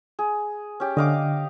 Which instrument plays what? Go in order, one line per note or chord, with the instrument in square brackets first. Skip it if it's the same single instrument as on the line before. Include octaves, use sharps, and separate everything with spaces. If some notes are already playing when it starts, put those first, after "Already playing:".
[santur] G#4
C#4 G4
[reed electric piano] D3 [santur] D#5 F5 D6